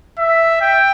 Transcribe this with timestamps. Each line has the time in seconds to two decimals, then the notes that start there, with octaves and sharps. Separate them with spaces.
0.19 E5
0.62 G5